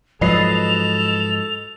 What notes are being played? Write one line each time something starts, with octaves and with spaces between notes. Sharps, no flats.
G#2 F3 F#3 A4 B4 D#5 C7 F7